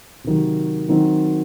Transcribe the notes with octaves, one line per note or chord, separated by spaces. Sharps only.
C3 D#3 F#3
D#3 F#3 C4 D#4 F#4